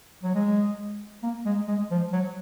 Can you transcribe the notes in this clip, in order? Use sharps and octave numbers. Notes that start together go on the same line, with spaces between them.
F#3
G#3
A#3
G#3
G#3
F3
F#3